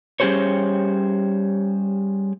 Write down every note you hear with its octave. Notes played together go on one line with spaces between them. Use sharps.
G3 C#4 G4 G#4 C5 C#5